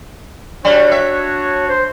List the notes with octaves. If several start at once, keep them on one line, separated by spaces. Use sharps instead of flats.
G3 D4 F#4 C#5
E5
C5